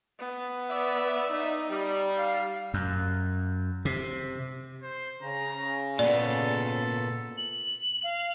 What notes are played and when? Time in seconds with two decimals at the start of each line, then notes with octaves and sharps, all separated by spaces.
0.19 B3
0.70 D5 E5
1.32 D#4
1.69 G3
2.17 F5
2.74 F#2
3.85 C3
4.82 C5
5.22 C#3 A#5
5.99 A#2 B3 A4 D5
7.38 F#7
8.04 F5